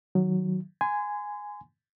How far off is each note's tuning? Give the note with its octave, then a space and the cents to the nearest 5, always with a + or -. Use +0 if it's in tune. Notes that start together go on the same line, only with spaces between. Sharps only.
D#3 +0 F#3 +0
G#5 +0 C6 -35